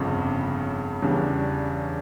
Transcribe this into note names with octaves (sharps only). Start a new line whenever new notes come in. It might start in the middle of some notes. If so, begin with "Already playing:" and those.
Already playing: G1 F2 C#3
E2 C#3 E3 G3 D4